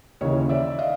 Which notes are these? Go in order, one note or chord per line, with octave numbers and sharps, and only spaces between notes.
D#2 C#3 E3 C#5 D#5
D5 E5
D#5 F5